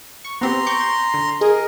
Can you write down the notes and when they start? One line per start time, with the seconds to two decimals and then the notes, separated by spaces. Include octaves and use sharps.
0.25 C#6
0.41 B3 C4 G4 A#5 C6
0.67 C#6 D6 G6
1.14 D3
1.41 G#4 A#4 D#5